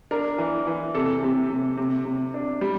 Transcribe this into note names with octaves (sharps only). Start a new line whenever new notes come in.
D4 A#4
E3
E3
C3 A4
C3
C3
C3
C3
D4
G3